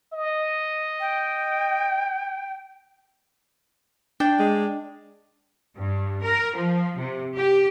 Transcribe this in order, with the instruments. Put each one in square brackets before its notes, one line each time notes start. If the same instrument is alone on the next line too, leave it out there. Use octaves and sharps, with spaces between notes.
[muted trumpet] D#5
[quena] G5
[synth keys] D4 [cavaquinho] G5
[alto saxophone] G#3
[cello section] G2
A#4
F3
C3
G4